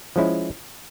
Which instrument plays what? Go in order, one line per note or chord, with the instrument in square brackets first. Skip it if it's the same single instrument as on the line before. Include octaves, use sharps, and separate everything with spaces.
[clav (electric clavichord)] F3 G#3 C#4 E4